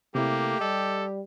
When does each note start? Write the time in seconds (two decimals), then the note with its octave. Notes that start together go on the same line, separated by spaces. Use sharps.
0.15 C3 A3 A#3 E4 G4
0.61 G3 A4 D#5